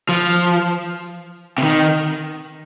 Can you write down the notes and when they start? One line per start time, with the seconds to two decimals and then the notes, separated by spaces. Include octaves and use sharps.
0.09 F3
1.58 C3
1.63 D#3